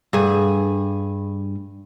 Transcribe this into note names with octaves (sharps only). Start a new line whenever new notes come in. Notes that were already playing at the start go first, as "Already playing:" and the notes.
G2 G#4